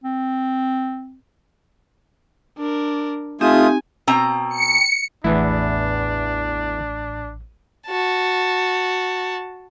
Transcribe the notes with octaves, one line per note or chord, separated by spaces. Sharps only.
C4
D4 A#4
A3 C4 D#4 F4 G4 G#5 D#6
B2 C4 A#5
C#7
A1 E2 A2 B3 D4 E4
F#4 A5